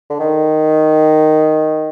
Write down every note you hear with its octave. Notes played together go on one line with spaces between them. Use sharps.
D3
D#3